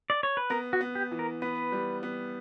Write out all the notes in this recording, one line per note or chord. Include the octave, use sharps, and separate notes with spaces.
D5
C#5
B4
B3 A#4
F#4
B3
G4
E3
A#4
B3 B4
G3
B3